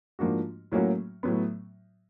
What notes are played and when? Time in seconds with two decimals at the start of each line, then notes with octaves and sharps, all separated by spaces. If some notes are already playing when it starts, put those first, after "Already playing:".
0.19 G#2 F3 A#3 D4 F#4
0.72 A2 F#3 A#3 C#4 F#4
1.23 A2 F#3 B3